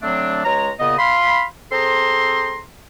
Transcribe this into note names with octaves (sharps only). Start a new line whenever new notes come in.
D3 F#3 A3 C4 D4
C#2 G#3 C#5 A#5
A#2 C#3 B3 D#5
F5 B5 C6
C4 G#4 A4 C5 A#5 C6